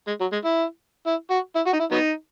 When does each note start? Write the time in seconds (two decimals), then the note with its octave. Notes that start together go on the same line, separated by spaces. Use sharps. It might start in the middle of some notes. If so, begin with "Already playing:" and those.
0.07 G#3
0.20 F#3
0.32 G#3
0.44 E4
1.06 E4
1.30 F#4
1.55 E4
1.66 F#4
1.73 D#4
1.79 E4
1.91 F#3 B3 D#4